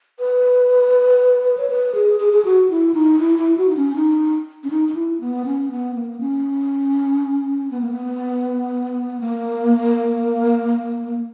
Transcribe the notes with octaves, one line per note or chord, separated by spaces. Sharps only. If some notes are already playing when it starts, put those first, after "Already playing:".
B4
C#5
B4
G#4
G#4
G#4
F#4
E4
D#4
E4
E4
F#4
D#4
C#4
D#4
C#4
D#4
D#4
E4
B3
C#4
B3
A#3
C#4
B3
A#3
B3
A#3